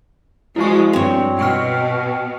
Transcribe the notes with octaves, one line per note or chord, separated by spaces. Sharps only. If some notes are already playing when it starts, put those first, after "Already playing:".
F3 G#3 E4 F#4 C#6
G2 C4 C#5
B2 G5 C#6 F6